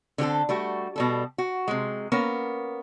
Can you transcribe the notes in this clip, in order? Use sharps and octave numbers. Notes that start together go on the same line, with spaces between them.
D3 C4 G4 A4
G3 A3 F#4
B2 G3 A4
F#4
C3 G#3
A#3 B3 C#4 A#4